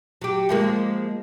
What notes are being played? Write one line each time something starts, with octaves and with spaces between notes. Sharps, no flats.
F#3 G4
F3 G#3 A#3